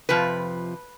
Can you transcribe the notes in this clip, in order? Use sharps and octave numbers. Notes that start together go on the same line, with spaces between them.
F2 C3 F3 B4